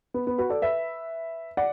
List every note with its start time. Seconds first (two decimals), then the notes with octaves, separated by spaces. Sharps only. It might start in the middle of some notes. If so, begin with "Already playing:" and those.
0.14 B3
0.27 B3
0.38 F#4 B4
0.50 A4 D5
0.62 B4 E5
1.57 D5 F#5